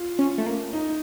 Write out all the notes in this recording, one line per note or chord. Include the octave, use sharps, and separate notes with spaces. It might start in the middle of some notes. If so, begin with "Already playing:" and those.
Already playing: F4
C#4
A3
A#3
D#4